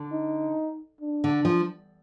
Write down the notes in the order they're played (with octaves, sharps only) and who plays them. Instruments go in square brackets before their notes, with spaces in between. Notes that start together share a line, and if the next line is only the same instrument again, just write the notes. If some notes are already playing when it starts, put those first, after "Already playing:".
Already playing: [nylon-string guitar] D3
[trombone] D#4
D4
[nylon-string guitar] D3
F3